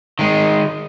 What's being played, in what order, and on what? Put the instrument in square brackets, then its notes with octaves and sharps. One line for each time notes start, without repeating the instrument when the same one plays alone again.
[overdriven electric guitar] D#3 G#3